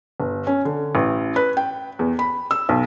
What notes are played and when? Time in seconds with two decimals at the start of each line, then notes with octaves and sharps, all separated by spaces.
0.20 G1
0.47 C#4
0.65 D3
0.95 A1
1.36 B4
1.57 G5
1.99 E2
2.19 B5
2.51 E6
2.69 B1